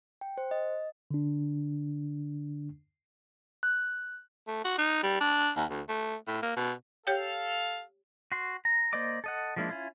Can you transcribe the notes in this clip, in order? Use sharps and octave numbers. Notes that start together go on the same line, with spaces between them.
G5
C5
D#5
D3 D4
F#6
A3
F#4
D#4
G3
D4
D#2
D2
A3
A2
A#3
B2
G4 A4 C#5 F5 G5
F#4 C6
A#5
A#3 C5 D5 D#5 D6
A4 D#5 F#5
F3 G#3 A#3 D4 E4
C#4 E4 F4